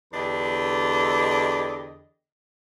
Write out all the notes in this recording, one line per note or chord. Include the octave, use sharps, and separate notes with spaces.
E2 D3 D4 G4 D#5